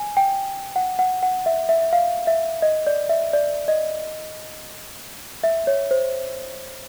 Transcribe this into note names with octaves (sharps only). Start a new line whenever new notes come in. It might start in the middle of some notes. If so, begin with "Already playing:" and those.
Already playing: G#5
G5
F#5
F#5
F#5
E5
E5
E5
F5
E5
D#5
D5
E5
D5
D#5
E5
C#5
C5